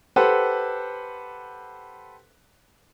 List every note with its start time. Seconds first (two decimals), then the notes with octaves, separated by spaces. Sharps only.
0.16 G4 A4 B4 C5 F#5